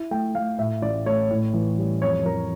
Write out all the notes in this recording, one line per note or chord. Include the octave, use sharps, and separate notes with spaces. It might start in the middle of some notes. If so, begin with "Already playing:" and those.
Already playing: E4
A3 G5
A3 F5
A2 E5
A1 D5
A3 C#5
A2
E3
G3
F2 C#5
E3 A#4